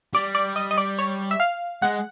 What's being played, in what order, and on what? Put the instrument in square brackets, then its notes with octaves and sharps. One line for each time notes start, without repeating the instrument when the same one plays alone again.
[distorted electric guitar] G3 [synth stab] D5
[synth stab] D5
D#5
D#5
D5
C#5
E5
F5
[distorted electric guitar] G#3 [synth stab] F#5